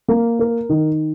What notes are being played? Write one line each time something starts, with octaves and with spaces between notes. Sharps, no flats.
A#3
A#4
D#3